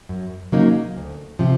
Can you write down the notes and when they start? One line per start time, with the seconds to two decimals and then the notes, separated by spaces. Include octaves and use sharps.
0.09 F#2
0.52 C#3 F#3 A#3 D#4
0.96 D2
1.39 C3 F3